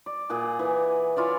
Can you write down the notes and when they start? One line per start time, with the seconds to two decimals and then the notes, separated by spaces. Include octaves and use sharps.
0.06 D5
0.30 A#2 G#4 F#5 G#5
0.59 E3
1.16 E4 F4 C#5 D5